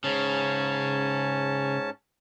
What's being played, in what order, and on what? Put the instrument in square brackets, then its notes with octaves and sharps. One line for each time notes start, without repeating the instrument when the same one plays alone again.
[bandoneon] G#2 C#4 A5 [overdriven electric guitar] C#3